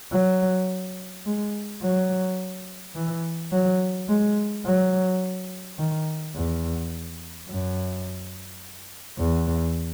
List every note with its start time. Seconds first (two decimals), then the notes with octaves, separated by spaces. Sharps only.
0.12 F#3
1.25 G#3
1.82 F#3
2.95 E3
3.52 F#3
4.08 G#3
4.66 F#3
5.78 D#3
6.35 E2
7.48 F#2
9.18 E2